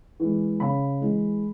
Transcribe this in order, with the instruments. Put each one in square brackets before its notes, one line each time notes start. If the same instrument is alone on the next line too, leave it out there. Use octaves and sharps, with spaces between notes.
[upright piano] E3 G#3
C#3 B5
E3 G#3